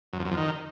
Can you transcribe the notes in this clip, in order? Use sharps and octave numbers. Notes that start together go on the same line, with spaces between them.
F#2
F2
F#2
F2
D#3